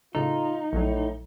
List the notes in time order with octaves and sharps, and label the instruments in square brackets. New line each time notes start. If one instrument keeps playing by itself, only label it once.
[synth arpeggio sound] A2 C#3 A4 [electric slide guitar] D#4 [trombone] F4
[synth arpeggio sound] A#1 F#3 [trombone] A2